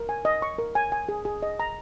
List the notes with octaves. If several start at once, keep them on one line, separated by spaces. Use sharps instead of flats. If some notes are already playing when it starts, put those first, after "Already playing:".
Already playing: A#4
G#5
D#5
C#6
A#4
G#5
G#5
G#4
G#4
D#5
A#5